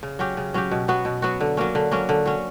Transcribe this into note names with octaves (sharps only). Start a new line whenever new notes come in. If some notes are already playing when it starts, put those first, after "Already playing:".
C#3
F#3 C#4 G4
C#3
F#3 C#4 G4
B2
F#3 B3 F#4
B2
F#3 B3 F#4
D3
F#3 A#3 C#4
D3
F#3 A#3 C#4
D3
F#3 C#4